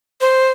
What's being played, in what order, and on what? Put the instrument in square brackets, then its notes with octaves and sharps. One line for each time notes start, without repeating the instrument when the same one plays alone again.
[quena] C5